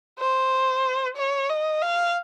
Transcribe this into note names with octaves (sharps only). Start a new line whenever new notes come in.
C5
C#5
D#5
F5